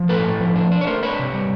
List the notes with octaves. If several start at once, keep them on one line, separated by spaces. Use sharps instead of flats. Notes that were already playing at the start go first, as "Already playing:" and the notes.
Already playing: F3
A2 A4 B4
A2
F3
D4
D4
C#5
A3 A#4 C5
D4 B4 C#5
C3
G3